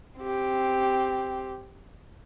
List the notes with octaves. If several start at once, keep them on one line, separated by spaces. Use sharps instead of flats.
C4 G4